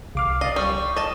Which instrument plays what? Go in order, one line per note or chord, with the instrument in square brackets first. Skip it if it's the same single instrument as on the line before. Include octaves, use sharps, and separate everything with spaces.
[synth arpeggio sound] C2 D6 F6 [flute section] F5
[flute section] D5 F5 [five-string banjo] D#5
[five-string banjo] G3 [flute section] C#6
[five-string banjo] D#5 A5